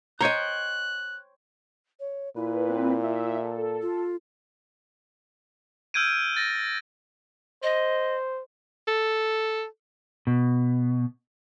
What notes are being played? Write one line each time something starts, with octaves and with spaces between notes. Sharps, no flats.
C5 C#5 D#5 G5 A#5 F#6
C#5
A#2 E4 B4
C4 B4
E5
A4
F4
E6 F6 G6 G#6 D7 D#7
A6 A#6
C5 D#5
A4
B2